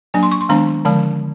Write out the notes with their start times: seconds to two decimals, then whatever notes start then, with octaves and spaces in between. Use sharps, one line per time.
0.14 F#3 A#3 D4 G#5
0.23 C6
0.32 C#6
0.41 C6
0.49 D#3 G#3 B3 D4 A#5
0.85 D3 F3 G#3 A5